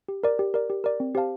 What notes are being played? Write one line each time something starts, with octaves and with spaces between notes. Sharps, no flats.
G4
A#4 D5
G4
A#4 D5
G4
A#4 D5
C4
G4 C5 F5 A5